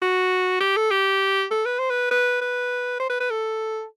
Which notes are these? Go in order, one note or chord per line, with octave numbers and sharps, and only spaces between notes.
F#4
G4
A4
G4
A4
B4
C5
B4
B4
B4
C5
B4
B4
A4